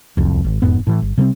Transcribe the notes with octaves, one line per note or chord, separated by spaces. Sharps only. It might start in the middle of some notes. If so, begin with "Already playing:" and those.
D1 C2 F2
G#1
E1 F2 G#2 B3
A2 E3
G1
C3 G3 A3 C4